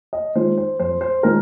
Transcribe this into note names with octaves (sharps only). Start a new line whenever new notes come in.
D#5
D#3 G#3 F4 C5
C5
F2 C5
C5
D#3 G#3 F4 A#4